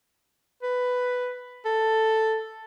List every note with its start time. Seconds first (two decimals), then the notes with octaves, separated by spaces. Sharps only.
0.63 B4
1.65 A4